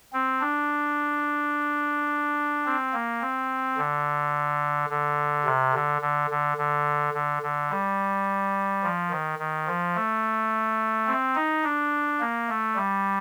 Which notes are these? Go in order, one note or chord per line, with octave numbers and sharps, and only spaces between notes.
C4
D4
C4
A#3
C4
D3
D3
C3
D3
D3
D3
D3
D3
D3
G3
F3
D#3
D#3
F3
A3
C4
D#4
D4
A#3
A3
G3